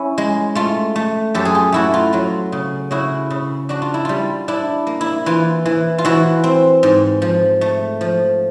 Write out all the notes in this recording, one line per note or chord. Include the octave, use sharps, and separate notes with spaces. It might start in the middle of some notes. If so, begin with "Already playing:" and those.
Already playing: C#4 E4
G#3
A3 F4
A3
F#2 G4 A4
G#4
F4 G4
A3 E4 F#4
F4
F#3 F4
C#3
C#3 E4 F#4
C#3
D4 F#4
F4
E4
G3 F4
D4 E4
A#3
E4
E3 F4
E3
F4
E3 E4 F#4
C4
G#2
F3
A3
F3